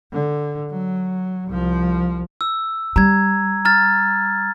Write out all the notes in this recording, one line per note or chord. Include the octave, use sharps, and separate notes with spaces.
D3
F#3
C2 F3
E6
G3 A#5 G#6
A#5 F6 A6